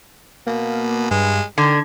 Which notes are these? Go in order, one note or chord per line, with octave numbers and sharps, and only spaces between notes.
B2 A#3
G2 G#3
D3 D#3 G#6